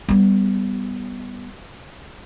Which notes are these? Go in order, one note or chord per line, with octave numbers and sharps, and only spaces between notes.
G3 B3